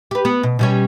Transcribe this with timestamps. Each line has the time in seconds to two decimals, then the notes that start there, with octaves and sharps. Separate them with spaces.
0.11 G4 B4
0.25 B3
0.43 B2
0.59 B2 G3 C#4